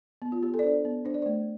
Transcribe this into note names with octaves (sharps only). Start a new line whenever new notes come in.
B3
F4
B3 G4
A4
D5
D4 C5
B3
D4 C5
D5
A3 C5